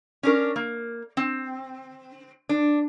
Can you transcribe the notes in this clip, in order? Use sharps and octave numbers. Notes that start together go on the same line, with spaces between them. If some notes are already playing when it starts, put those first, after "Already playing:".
C#4 D4 A#4
A#3
C4
D4